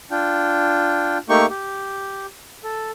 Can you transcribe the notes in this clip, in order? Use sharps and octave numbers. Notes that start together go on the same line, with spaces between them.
D4 F4 G5
A3 A#3 D#4 G4 G5 C#6
G4
A4